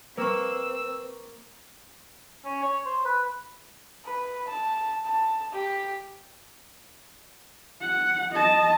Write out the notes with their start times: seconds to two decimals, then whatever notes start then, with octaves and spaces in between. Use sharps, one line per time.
0.17 A#3 C4 B4 C#6 E6
2.45 C#4
2.62 C#5
2.85 C5
3.05 B4
4.05 B4
4.48 A5
5.05 A5
5.52 G4
7.82 F#5
8.33 D#5 A5